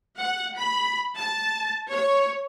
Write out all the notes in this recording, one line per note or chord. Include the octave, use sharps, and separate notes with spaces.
F#5
B5
A5
C#5